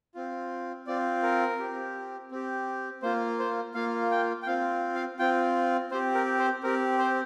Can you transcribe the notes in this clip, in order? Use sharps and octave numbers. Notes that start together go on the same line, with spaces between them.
C4 F4
C4 F4 D5
A#4
C4 G4
C4 G4
A#3 F4 C5
C5
A#3 F4 F5
G5
G5
C4 F4 F5
F5
C4 F4 G5
C4 G4 C5
A#4
C5
C4 G4 A#4
C5